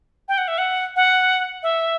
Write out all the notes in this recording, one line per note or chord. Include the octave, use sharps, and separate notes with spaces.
G5
F#5
E5
F#5
F#5
E5